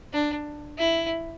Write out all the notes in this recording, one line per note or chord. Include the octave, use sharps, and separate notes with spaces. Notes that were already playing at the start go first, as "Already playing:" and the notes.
D4
E4